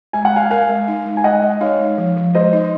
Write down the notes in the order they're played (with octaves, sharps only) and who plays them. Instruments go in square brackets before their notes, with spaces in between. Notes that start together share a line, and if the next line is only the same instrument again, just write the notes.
[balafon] G#3 [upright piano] G#5
[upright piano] F#5
[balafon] G#3 [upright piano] F5 G#5
[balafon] A#4 [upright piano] F5 G#5
[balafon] G#3
D#4
G#3
[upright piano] G#5
[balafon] G#3 [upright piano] D#5 F#5
[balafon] G#3
[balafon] D#4 [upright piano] C#5 F5
[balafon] G#3
F3
F3
[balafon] G#3 [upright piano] C5 D#5
[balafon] D#4